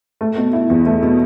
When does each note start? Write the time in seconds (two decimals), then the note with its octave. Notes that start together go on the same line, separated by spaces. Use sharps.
0.21 A3
0.37 B2
0.53 E4
0.70 E2
0.86 A3
1.02 B2